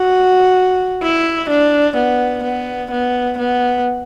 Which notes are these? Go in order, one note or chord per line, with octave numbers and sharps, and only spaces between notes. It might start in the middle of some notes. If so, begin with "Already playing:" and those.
Already playing: F#4
E4
D4
B3
B3
B3
B3